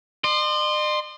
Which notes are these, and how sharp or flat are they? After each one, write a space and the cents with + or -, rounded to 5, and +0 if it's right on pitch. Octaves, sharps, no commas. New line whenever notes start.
D#5 -45 C6 +0